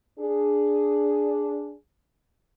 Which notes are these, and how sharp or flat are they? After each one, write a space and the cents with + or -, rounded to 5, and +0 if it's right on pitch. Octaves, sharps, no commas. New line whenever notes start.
D4 -5 G#4 +0